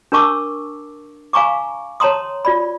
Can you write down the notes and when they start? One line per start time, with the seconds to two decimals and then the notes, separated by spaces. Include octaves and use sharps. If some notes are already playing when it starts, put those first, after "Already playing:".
0.12 D4 A#4 A5 C#6 D6 E6
1.33 F5 G#5 A#5 C#6 D6
2.00 C#5 A5 A#5 C6 D#6
2.45 F4 D5 B5